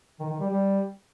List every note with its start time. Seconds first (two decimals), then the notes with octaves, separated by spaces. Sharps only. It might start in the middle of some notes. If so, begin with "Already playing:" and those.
0.20 D#3
0.30 D#3
0.40 G3
0.50 G3